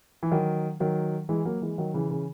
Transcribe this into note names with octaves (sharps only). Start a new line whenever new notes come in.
E3
D#3 F#3
D#3 F#3
E3 G#3
F#3 A#3
E3 G#3
D#3 F#3
C#3 E3
C#3 E3